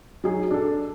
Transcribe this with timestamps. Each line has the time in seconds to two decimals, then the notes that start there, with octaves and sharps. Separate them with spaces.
0.24 F#3 D#4 G#4
0.51 D4 A4